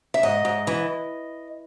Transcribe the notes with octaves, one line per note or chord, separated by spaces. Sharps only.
E5
G#2 D#5
G#2
E3